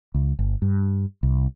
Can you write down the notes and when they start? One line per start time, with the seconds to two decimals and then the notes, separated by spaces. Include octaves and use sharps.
0.14 C#2
0.39 G1
0.62 G2
1.23 C2